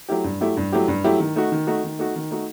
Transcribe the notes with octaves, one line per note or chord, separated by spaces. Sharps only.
F#3 A3 E4 G4
G2
F#3 A3 E4 G4
G2
F#3 A3 E4 G4
G2
F#3 A3 E4 G4
D#3
A3 D#4 F#4
D#3
A3 D#4 F#4
D#3
A3 D#4 F#4
D#3
A3 D#4 F#4